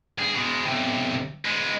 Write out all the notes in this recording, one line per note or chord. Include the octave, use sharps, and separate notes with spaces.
G2 G#4
B2 G#3
B1 C3
G#3 B3